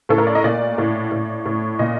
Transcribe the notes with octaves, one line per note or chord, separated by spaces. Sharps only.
A2 A4
A#4
D5
D#5
A#2 D5
A2
A2
A2
A#2 D#5